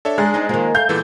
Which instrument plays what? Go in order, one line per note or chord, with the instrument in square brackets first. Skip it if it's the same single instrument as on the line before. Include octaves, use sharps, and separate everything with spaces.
[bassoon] D4 [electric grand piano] A4 C#5 E5
[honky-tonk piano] G#3 [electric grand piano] G#5 A#5 A6
[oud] B3 C4 D#4
[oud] D#3 A#3 [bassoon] F3
[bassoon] A3 [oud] F5 [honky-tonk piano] G6
[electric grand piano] A#2 E3 A4 [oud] G#3 [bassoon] B3